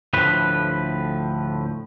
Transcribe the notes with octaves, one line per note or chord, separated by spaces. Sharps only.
D2 A2 F3 B4